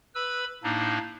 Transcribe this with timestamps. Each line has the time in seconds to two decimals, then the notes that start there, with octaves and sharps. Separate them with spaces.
0.15 B4 B5 E6
0.63 A2 A#3 D4 D#4